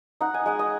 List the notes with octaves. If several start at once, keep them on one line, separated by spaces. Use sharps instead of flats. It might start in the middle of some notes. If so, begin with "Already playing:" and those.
D#4 F#5
G#5
G#3 F#5
D#5